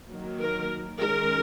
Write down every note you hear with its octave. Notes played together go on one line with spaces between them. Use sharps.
D#3 F#3 A#3
A#4
D#3 G#3 C#4 A#4